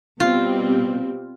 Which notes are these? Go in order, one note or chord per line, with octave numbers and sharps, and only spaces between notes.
B2 G3 C4 F4